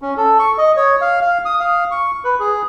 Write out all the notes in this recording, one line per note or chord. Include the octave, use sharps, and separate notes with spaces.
C#4
A4
C#6
D#5
C#5
F5
F5
D#6
F5
C#6
B4
G#4